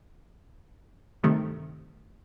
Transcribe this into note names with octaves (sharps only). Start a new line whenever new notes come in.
G2 C3 D#3 A3